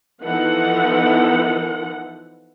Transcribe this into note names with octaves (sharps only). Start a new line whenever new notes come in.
E3 F3 B3 D#4 A4 F#5